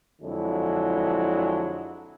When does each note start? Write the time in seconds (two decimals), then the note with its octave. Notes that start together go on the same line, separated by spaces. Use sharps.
0.21 F2 D3 F#3 G#3 E4